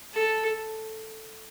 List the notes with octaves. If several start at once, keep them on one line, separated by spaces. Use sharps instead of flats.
A4